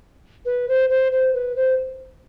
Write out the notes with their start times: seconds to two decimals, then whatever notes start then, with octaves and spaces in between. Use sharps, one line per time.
0.45 B4
0.68 C5
0.89 C5
1.12 C5
1.33 B4
1.56 C5